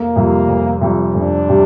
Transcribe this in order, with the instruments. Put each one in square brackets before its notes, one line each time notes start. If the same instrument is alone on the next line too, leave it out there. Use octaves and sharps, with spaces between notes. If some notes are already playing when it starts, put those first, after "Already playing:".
Already playing: [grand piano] F1 [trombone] A#3
[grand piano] F2 C3 G3
F1
F2 C3 G3
[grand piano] F1 [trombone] D4
[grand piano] C3 G3